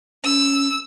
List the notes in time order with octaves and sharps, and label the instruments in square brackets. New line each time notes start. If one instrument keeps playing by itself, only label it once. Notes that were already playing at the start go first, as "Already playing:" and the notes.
[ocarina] C#4 [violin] E6